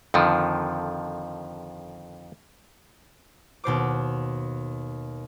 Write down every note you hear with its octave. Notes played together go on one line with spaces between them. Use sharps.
F2 D3 D#3 F3
D#2 B2 C5 D6